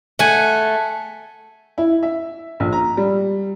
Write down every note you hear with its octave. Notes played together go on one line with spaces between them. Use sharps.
A3 F#5 G#5
E4
E5
A#1
A#5
G3